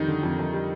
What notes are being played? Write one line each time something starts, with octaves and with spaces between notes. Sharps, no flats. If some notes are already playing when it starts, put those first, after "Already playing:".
Already playing: F2 D#3 G3 D#4
D3
F2
F2
G3